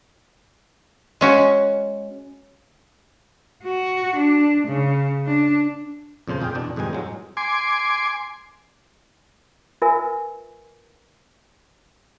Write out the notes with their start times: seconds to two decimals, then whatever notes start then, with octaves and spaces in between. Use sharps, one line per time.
1.21 G#3 C#4 F#4
3.64 F#4
4.17 D4
4.69 C#3
5.27 D4
6.28 F2 A#2 C#3 C5 A5
6.41 F2 F4 G#4 F5 G5
6.55 E2 B2 D4
6.76 F2 G#2 D#3 G3 G#5
6.93 A2 F#3 G#3
7.37 G#5 C6 D6
9.82 F4 A#4 B4 E5 G#5 E6